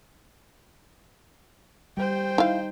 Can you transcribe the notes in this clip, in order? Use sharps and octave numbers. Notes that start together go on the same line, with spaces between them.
G3 C5 G5
D#4 E4 F5